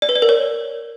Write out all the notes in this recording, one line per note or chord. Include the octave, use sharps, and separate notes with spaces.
D5
B4
D5
A#4
C#5